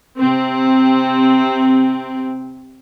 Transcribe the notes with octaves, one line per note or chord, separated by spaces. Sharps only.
C3 C4